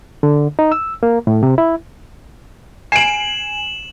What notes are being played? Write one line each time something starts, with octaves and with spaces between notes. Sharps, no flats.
D3
D#4
E6
A#3
A2
C3
E4
G#5 C7 D7 E7 F#7